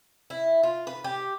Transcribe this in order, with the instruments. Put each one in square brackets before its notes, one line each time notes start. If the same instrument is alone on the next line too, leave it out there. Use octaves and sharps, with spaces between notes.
[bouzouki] E4
F4
B4
G4